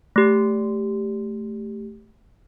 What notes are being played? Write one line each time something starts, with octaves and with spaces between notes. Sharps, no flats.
A3 G4